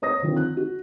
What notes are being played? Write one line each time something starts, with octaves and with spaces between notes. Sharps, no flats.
C5 C#5 D#6 A#6
D3 D#3 F3 C4
F#6
F#4